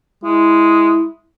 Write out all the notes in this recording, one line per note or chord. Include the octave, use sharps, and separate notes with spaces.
G#3 E4